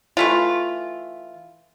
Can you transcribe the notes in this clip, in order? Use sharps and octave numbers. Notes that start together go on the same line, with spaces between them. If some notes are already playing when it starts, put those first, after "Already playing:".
E3 A3 F4